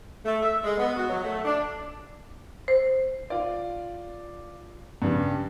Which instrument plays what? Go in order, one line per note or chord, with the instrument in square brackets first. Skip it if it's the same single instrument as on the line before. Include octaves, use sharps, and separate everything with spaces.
[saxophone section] A3
E5
G#3
B3
F#4
F#3
A3
D4
[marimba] C5
[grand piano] F4 D5
G2 C#3 G3